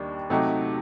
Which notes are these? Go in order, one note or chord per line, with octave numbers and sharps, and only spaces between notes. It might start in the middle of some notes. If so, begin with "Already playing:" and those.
Already playing: D#2 D#3 G3 D4
C3 F#3 A3 D#4 G4